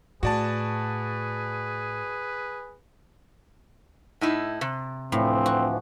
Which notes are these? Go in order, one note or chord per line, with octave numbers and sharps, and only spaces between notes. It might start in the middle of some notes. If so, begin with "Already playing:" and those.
A2 F#4 G#4 B4 D5 A5
A2 D#4 E4
C3
D2 A2 E3 F3 C4
F#4